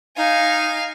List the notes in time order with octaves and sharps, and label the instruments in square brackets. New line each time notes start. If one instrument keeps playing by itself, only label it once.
[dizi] D#4 [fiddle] F5 G#5